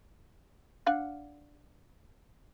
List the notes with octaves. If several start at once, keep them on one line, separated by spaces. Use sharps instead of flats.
D4 F5 F#5